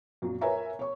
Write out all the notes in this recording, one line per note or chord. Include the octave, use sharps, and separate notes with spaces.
F#2 A#2 F#3
A#4 B4 C#5 E5 G#5 A#5
C#5 C#6